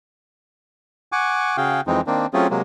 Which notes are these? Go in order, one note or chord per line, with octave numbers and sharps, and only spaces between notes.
F#5 G#5 C#6 D6
C#3 F#4 G#4 F5 G5
F2 E3 G#3 C4 D#4
D#3 A#3 C4 D4
F#3 A3 C4 C#4 F4 G#4
C3 F#3 G#3 A#3